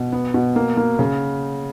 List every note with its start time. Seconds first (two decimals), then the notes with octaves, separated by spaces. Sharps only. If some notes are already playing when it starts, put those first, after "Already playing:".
Already playing: B2
0.12 B3
0.34 B2
0.56 A#3
0.77 A#3
0.99 C#3